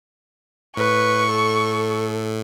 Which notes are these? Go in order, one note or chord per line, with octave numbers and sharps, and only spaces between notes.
A2 B4 C#6
A4